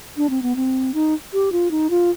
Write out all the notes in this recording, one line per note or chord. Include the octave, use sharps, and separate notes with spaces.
D4
C4
B3
C4
D#4
G4
F4
D#4
F4